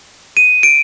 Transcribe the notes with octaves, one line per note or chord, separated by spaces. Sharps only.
D#7
D7